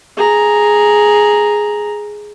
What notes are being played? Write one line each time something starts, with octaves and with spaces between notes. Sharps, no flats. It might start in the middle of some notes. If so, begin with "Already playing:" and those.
G#4 A#5